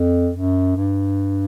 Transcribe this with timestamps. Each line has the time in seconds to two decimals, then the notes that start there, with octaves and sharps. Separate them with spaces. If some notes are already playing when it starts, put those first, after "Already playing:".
Already playing: F2
0.35 F#2
0.76 G2